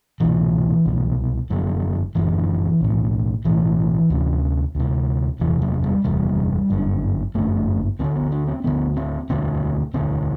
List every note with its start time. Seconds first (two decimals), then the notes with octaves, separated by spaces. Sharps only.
0.20 C2 B2 E3
0.86 C2 B2
1.50 F#1 F#2 D3 F#3
2.15 F#1 F#2 D3 E3
2.81 B1 A2
3.45 B1 A2 E3
4.10 D2 C3
4.75 D2 C3
5.40 F#1 E2 C3 E3
5.62 F#3
5.84 G3
6.04 F#1 E2 C3 G3
6.70 G1 F#2 D3
7.35 G1 F#2 D3 A3
7.99 D2 D3 C4
8.16 B3
8.32 D4
8.48 C4
8.64 D2 D3 B3
8.97 C4
9.29 E1 D2 D3 C4
9.94 E1 D2 D3 C4